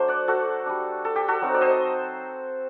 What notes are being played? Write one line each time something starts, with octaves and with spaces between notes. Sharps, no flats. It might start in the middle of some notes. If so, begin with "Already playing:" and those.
Already playing: F#3 A3 D4 C5
D5 F#5
F#4 A4
G3 D4
A4
G4
F#4 A4
F#3 C4 D#4
D5
C5 D#5